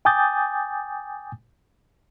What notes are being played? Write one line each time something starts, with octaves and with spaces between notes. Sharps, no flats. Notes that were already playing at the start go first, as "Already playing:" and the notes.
G5 G#5 D6 D#6 G6 A6